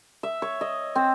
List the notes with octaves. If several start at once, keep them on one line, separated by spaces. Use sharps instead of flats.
E5
C#5
D#5
C4